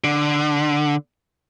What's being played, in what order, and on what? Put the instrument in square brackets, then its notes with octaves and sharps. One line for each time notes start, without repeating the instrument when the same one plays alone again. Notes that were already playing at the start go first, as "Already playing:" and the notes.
[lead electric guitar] D3